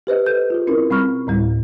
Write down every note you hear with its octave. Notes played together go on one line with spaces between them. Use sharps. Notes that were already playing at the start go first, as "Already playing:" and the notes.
G4 B4 C5 D#5
A4 B4 G6
F4 G#4
C4 C#4 E4 A#4
B2 G3 C4 B5 C#6 F6
D2 A2 G3 E4